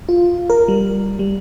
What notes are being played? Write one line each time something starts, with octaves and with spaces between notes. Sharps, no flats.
F4
A#4
G3
G3